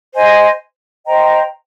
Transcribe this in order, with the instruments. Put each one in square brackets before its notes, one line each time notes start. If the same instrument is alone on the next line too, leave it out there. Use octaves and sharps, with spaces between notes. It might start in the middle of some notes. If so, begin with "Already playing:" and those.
[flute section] C5 D#5 G#5
C5 D#5 G5 A#5